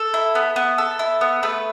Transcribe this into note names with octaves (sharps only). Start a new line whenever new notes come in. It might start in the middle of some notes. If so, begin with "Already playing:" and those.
Already playing: A4
E4
B3
B3
A4
E4
B3
A3 B4